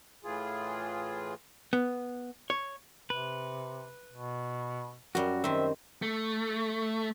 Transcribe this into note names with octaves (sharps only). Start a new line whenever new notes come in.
A2 E3 F4 G#4
B3
C#5
C3 B4
B2
F#2 G3 F#4
D#3 C4 C5 E5
A3